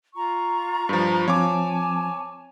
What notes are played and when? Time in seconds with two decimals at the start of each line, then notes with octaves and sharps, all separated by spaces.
0.14 F4 A#5 C#6
0.89 G2 F3
1.28 F3 C4 C#5 G#5 A5 D6